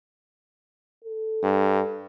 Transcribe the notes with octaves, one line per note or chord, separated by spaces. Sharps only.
A4
G2